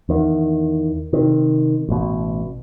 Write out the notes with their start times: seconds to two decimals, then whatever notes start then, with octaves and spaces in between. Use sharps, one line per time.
0.09 E2 D#3
1.13 C3 D#3
1.89 A1 B2